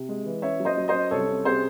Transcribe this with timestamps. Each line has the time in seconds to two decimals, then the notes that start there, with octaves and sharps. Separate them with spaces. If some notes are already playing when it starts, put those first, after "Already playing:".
Already playing: C3
0.09 G#3
0.25 E3
0.42 C#4 C#5 E5
0.60 F#3
0.65 C5 D#5
0.77 F#3
0.88 C5 D#5
0.94 C#4
1.11 C2 A4 C#5
1.28 C#4
1.45 C3 G#4 C5